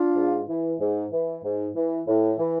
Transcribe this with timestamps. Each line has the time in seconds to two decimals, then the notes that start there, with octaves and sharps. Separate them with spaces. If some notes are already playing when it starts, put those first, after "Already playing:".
Already playing: D4 F4
0.16 G#2
0.49 E3
0.80 G#2
1.12 E3
1.44 G#2
1.76 E3
2.08 A2
2.38 E3